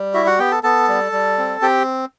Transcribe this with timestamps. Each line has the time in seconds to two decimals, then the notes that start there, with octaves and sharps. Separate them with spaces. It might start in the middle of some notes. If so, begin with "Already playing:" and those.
Already playing: G3
0.14 E4 F#4 E5
0.26 F#4 F#5
0.39 B3 G4 G5
0.52 A4 A5
0.63 B3 A4 A5
0.88 G3
1.12 G3
1.38 C4
1.62 C4 G4 G5